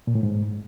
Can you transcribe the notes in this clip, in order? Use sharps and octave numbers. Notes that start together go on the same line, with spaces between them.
A#2
A2
G#2